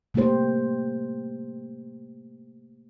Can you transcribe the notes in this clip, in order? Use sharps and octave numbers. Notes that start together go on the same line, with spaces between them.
C3 A3 A#3 G4 C5